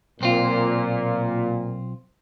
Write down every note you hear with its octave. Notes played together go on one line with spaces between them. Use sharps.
B1 A#2 C4 F4